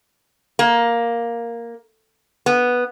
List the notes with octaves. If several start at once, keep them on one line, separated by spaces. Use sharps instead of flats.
A#3
B3